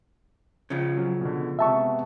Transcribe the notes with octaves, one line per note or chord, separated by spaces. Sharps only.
C#3 F3
F#3 C#4
B2 D3
C3 G#3 B3 E5 A5 C#6